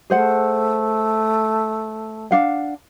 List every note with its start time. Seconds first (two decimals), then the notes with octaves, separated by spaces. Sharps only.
0.10 A3 G#4 C5 F#5
2.31 D4 F5 F#5